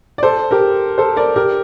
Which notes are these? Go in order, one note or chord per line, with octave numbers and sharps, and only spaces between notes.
D5
A4 C5
G4 A#4
A4 C5
A#4 D5
G4 A#4